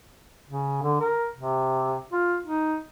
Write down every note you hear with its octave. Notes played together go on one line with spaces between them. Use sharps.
C#3
D3
A#4
C3
F4
D#4